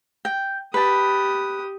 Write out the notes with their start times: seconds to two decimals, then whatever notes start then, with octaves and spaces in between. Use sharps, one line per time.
0.25 G5
0.74 G4 B4 A5 D#6